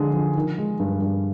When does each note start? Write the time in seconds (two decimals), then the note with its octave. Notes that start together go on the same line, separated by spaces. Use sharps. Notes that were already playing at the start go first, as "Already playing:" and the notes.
Already playing: D3 F3 G#3 G#4
0.13 F3
0.35 D#3
0.58 G#3
0.79 G2
1.02 G2